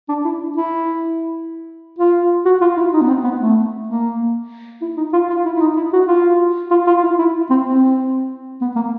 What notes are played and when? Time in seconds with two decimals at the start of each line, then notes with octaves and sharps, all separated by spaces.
0.09 D4
0.25 E4
0.56 E4
1.99 F4
2.45 F#4
2.61 F4
2.77 E4
2.93 D#4
3.01 B3
3.08 C4
3.24 B3
3.41 A3
3.87 A#3
4.82 E4
4.97 D#4
5.13 F4
5.30 F4
5.45 E4
5.57 E4
5.61 D#4
5.76 E4
5.93 F#4
6.07 F4
6.71 F4
6.87 F4
7.03 E4
7.19 E4
7.50 C4
7.66 C4
8.61 B3
8.76 A#3